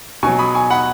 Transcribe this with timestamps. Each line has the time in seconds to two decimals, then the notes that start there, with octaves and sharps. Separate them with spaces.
0.23 B2 F#3 G#5 C#6
0.39 B5 D#6
0.55 G#5 C#6
0.70 F#5 B5